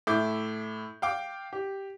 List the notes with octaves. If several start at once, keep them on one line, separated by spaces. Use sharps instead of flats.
A2 E5 D6 G6
F5 G5 D6
G4